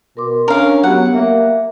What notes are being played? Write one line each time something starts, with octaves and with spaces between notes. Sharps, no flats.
B2 A#4 C6 D6
C#4 D4 A#4 F5
F#3 B3 G4 F#5
A#3 E5